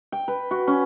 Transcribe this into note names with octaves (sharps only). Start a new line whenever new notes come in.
G5
B4
F#4
C#4